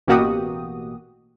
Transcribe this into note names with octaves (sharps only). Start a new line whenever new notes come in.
A1 B2 A#3 F#4 G4 D#6